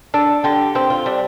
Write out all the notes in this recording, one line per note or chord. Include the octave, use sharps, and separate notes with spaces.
D4 A4
D3 G4
C4 G4
F4
G3 D4